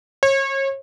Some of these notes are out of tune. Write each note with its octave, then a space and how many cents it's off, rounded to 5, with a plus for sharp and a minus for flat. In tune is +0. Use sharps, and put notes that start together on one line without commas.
C#5 -35